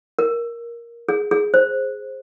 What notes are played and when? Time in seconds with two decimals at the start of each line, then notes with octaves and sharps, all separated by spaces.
0.19 A#4
1.09 G#4
1.31 G#4
1.54 C5